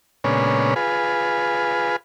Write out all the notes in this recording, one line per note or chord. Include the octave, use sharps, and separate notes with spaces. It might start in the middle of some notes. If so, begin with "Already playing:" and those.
A#2 C#3 G#3 B3 C#4 D4
F4 G#4 B4